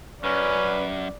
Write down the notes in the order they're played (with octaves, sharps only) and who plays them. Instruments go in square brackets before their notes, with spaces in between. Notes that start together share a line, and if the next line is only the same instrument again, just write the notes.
[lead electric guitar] F#2 [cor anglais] C#4 [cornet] B4 [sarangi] D5